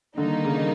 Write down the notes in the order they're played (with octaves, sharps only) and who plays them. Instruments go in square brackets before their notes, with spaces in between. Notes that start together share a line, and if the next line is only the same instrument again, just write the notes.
[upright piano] D3 [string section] D#3 G3 A#3 D#4
[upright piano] C#3